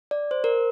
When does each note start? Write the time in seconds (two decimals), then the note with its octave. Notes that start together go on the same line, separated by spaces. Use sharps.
0.11 D5
0.31 C5
0.44 A#4